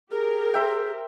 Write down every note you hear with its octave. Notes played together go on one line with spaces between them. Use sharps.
G4 G#4 A#4
C5 E5 G5